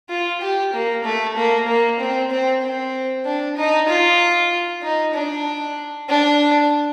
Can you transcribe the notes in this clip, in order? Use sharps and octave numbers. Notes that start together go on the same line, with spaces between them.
F4
G4
A#3
A3
A#3
A#3
C4
C4
C4
D4
D#4
F4
D#4
D4
D4